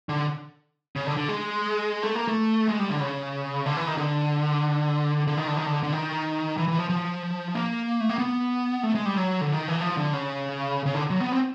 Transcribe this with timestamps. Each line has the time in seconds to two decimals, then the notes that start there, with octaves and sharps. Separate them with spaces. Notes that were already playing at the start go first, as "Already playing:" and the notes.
0.09 D3
0.96 C#3
1.07 D3
1.17 D3
1.29 G#3
2.03 A3
2.15 A#3
2.28 A3
2.68 G#3
2.79 G3
2.90 D3
3.00 C#3
3.66 D3
3.77 E3
3.87 D#3
3.97 D3
5.28 D3
5.37 D#3
5.47 D3
5.57 D#3
5.66 D3
5.83 D3
5.93 D#3
6.57 E3
6.68 E3
6.78 F3
6.90 F3
7.55 A#3
8.00 A3
8.09 A#3
8.18 B3
8.83 A3
8.95 G#3
9.06 G3
9.16 F#3
9.41 D3
9.54 D#3
9.68 E3
9.81 F3
9.97 D3
10.13 C#3
10.86 C#3
10.94 D3
11.10 F#3
11.20 B3
11.32 C4